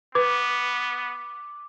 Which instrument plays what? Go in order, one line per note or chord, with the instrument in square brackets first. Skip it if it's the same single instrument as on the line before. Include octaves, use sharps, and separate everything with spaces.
[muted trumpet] B3 [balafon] B4 [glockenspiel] D6